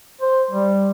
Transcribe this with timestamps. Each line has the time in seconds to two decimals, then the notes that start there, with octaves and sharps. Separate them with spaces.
0.21 C5
0.51 G3